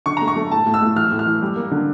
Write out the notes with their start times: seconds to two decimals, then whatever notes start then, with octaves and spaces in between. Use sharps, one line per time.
0.06 D3 C#6
0.17 A3 A#5
0.28 C#6
0.36 A3
0.51 A2 A5
0.66 A2
0.74 E6
0.81 A2
0.96 E3 F6
1.12 A2
1.19 F6
1.26 E3
1.42 G3
1.56 A#3
1.71 D3